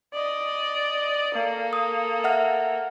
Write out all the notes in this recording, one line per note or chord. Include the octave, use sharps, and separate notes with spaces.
D5 D#5
A#3 A4
D#6
E5 F#5 F6